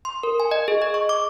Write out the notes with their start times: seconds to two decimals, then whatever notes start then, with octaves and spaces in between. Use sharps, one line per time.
0.05 C6
0.23 A#4
0.40 G#5
0.51 D#5
0.68 G#4
0.82 D#5
0.94 C#6
1.09 D6